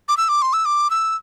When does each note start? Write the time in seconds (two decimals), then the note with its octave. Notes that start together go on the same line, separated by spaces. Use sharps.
0.08 D6
0.17 E6
0.29 D6
0.42 C6
0.53 E6
0.65 D6
0.90 E6